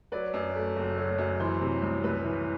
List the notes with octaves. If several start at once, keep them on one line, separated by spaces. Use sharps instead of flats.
F#3 B4 D5
F#2
A3
F#1
F#3
F#2
E3 C5
C3
C2
C2 B4
E3